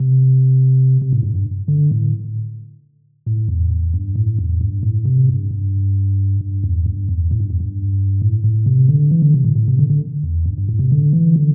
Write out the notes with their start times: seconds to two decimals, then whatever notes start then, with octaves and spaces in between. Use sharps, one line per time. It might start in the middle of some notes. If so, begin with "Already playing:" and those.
Already playing: C3
1.02 C3
1.13 A2
1.23 G2
1.35 G2
1.68 D3
1.91 A2
3.26 A2
3.48 E2
3.70 E2
3.94 G2
4.15 A2
4.39 E2
4.61 G2
4.83 A2
5.05 C3
5.29 G2
5.51 G2
6.41 G2
6.64 E2
6.86 G2
7.09 E2
7.31 A2
7.40 G2
7.50 E2
7.60 G2
8.22 A2
8.44 A2
8.66 C3
8.89 D3
9.11 E3
9.22 D3
9.34 C3
9.44 A2
9.55 A2
9.68 C3
9.79 D3
9.89 D3
10.23 E2
10.46 G2
10.58 G2
10.69 A2
10.79 C3
10.92 D3
11.13 E3
11.36 D3